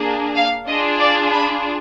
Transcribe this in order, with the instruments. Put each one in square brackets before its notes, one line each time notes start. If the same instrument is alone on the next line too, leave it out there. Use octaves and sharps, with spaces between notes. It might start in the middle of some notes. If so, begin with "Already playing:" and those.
Already playing: [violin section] A#3 D4 G#4
F5
D4 F4 G#4 D#5
D5
B5